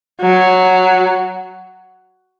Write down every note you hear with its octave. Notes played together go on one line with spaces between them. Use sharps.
F#3